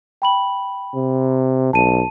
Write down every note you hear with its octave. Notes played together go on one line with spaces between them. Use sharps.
G5 B5 F#7
C3
B1 A5 D#7